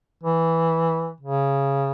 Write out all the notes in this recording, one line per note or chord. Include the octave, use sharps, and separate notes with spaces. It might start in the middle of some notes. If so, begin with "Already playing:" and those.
E3
C#3